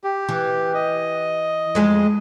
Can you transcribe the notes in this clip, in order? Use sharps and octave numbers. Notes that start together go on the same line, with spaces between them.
G4
E3
D#5
F2 G#3 G#4